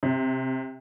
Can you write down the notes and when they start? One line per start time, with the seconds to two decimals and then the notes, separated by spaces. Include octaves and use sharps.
0.03 C3